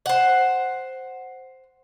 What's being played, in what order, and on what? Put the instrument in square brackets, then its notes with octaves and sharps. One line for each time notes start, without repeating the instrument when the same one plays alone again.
[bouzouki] C5 F#5